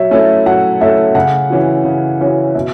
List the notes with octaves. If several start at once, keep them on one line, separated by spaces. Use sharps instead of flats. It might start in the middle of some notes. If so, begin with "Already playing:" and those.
Already playing: F#3 C#5 E5
A3 C#4 E4 A4
F#3 F#5
A3 C#4 E4 A4 E5
C#3 F#5
E3 C#4 F#4
C#3
E3 C#4 F#4
B2 E5